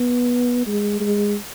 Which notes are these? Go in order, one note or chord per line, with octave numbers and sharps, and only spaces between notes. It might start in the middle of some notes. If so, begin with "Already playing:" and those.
Already playing: B3
G#3
G#3